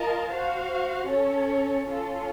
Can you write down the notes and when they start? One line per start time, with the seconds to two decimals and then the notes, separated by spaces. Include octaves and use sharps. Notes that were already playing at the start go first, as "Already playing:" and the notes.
Already playing: F4 A#4 D#5 A5
0.30 F#4 C5 F5
1.09 C#4 A4 C#5
1.87 C#4 F4 A4